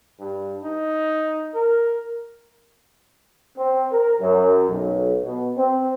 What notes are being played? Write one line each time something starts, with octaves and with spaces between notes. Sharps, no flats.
G2
D#4
A#4
C4
A#4
F#2
B1
B2
C4